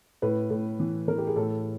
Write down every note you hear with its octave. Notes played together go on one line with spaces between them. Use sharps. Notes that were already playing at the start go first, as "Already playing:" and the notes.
A2 B4
A2
E3
E3 A#4
G4
G#4
A2 A4